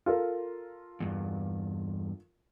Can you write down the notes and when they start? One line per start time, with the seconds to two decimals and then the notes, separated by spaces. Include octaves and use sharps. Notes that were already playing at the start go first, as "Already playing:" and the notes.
0.06 F4 A4 A#4
1.00 E2 G2